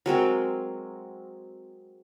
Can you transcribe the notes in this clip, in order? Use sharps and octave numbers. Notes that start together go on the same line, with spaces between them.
F#3 G#3 C4 A#4